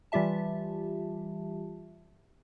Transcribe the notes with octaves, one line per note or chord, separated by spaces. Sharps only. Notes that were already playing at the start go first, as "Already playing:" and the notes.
E3 G3 F4 G4 E5 A5